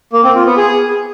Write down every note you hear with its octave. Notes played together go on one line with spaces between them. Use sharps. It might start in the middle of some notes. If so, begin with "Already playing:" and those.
A#3
C4
F4
B3
G#4